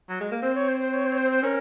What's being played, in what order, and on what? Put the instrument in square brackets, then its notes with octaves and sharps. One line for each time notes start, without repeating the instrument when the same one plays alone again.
[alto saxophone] F#3
G#3
A#3
[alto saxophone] C4 [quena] C5
[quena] C#5
C5
C5
C#5
C5
C#5
C5
C5
[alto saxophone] C#4 [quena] A#4